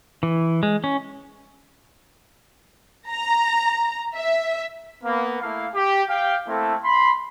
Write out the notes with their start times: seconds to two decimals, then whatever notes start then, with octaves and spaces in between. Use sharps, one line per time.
0.23 E3
0.63 G#3
0.84 C#4
3.09 A#5
4.15 E5
5.03 A#3 B3
5.42 A3 A#3 E4 F5
5.74 G4
6.10 G4 F5 G5
6.47 A3 A#3 C4 E4 A4
6.83 B5 C6